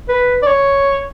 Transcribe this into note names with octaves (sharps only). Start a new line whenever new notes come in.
B4
D5
C#5